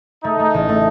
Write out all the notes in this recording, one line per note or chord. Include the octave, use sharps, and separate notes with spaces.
A3 D#4
A3
A1
A3